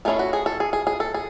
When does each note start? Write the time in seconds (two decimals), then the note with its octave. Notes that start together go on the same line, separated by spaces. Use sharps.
0.05 A3 C#4 E4 G#4
0.19 F#4
0.33 G#4
0.46 A4
0.60 G#4
0.73 G#4
0.87 G#4
1.00 A4
1.14 G#4